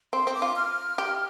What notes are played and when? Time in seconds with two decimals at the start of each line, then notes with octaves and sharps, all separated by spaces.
0.13 C4 C6
0.27 C4
0.34 D6
0.42 F4
0.56 F6
0.98 G4